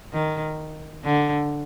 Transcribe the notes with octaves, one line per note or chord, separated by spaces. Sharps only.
D#3
D3